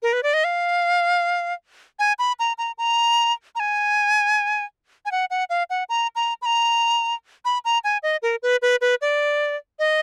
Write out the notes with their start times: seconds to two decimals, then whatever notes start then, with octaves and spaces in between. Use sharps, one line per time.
0.03 A#4
0.13 B4
0.23 D5
0.34 D#5
0.44 F5
1.99 G#5
2.19 B5
2.39 A#5
2.58 A#5
2.78 A#5
3.55 A#5
3.60 G#5
5.06 G#5
5.12 F#5
5.31 F#5
5.50 F5
5.70 F#5
5.89 A#5
6.15 A#5
6.42 B5
6.46 A#5
7.45 B5
7.65 A#5
7.84 G#5
8.03 D#5
8.22 A#4
8.43 B4
8.62 B4
8.81 B4
9.01 D5
9.79 D#5